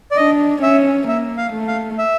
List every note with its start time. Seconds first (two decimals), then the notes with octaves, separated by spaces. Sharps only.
0.12 D5
0.17 D4 D#5
0.62 C#4 E5
1.08 A#3 E5
1.38 F5
1.53 A3
1.68 F5
1.98 E5